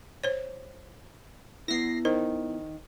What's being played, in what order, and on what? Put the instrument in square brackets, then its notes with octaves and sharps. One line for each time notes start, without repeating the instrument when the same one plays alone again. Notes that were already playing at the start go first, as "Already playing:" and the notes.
[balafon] C5 C#5
[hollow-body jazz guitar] B3 E4 [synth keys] A#6 C7
[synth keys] D#3 [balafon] C5